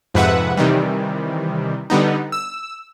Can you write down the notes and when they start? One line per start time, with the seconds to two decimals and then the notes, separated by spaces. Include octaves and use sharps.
0.14 F2 G#2 C3 B4 E5 F#5
0.57 C3 D#3 E3 G3
1.90 D3 G3 B3 D#4
2.32 E6